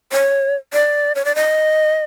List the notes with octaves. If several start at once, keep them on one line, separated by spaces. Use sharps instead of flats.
C#5
D5
C#5
D5
D#5